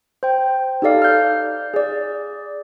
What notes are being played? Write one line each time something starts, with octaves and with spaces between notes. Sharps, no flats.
C5 G5
D#4 G4 A4 D5 F5
F6 G6
G#4 D5